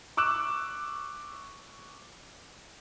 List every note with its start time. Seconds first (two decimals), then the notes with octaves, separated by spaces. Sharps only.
0.17 C#6 D6 E6 F#6 E7